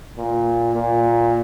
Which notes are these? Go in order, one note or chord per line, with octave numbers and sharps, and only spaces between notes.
A#2
A#2